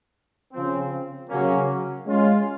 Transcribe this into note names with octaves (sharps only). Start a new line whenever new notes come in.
C#3 F3 C4
C#3 F#3 A#3 C#4
G#3 C#4 F4